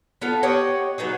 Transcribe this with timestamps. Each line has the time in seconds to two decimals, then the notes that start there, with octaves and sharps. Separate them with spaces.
0.21 B3 F4 A4
0.43 G4 C#5 D#5 F#5
0.98 F#3 B3 D#4 G#4